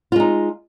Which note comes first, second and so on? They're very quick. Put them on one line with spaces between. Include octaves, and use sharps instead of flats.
F4 G#3 D#4